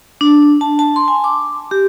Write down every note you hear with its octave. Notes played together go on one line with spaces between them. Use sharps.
D4
A5
A5
C6
G#5
D6
G4